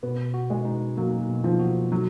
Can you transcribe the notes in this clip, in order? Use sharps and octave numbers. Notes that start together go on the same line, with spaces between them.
B2 B3
F#4
G#3
D#4
F#3 A#3
B2
F3
F#4
F#3